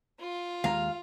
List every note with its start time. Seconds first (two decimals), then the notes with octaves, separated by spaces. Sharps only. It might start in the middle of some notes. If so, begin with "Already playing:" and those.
0.20 F4
0.64 D#2 G#3 F5 A#5